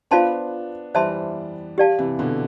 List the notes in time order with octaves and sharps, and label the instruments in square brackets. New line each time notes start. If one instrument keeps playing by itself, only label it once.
[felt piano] B3 D4 [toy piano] F4 C5 F5 A5 C6
[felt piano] E3 G3 [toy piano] C5 E5 A5 C6
[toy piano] G4 D5 F5 A5
[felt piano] C3 E3
B2 D3